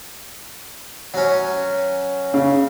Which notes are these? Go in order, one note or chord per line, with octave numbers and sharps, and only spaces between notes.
F#3 C#4
C#3